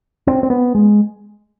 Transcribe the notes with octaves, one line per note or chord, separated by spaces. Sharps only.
C4
C4
B3
G#3